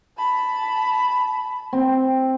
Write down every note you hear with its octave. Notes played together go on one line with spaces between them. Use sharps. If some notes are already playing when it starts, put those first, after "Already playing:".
A5 B5
C4